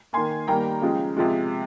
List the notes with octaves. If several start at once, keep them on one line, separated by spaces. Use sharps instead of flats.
D#3 A#3 G#5 C6
D#3 G3 A#3 G5 A#5
C#3 F3 G#3
C3 F3 G#3